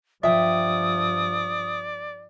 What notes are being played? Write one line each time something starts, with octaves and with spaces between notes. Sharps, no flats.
G2 F3 D5 E5 G5 D#6